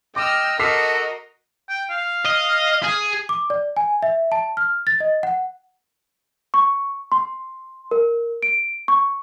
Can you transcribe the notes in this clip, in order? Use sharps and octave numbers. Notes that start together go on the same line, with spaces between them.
D#5 G5 D6 E6 F6
F#4 A4 A#4 D#5 D6 E6 B6 C7
G5
F5
D#5
G#4
D6
D5
G#5
E5
A5
F6
A6
D#5
F#5
C#6
C6
A#4
D7
C#6